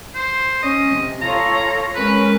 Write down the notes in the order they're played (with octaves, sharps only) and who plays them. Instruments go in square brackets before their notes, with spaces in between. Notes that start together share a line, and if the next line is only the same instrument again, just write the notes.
[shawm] C5
[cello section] C#4 [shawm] D#5
[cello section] C3
[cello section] F4 A4 C#5 [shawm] A#5
[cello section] G#3 C#4 A#4 [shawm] B4